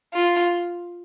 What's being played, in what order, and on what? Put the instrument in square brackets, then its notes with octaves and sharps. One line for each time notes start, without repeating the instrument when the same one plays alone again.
[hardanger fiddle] F4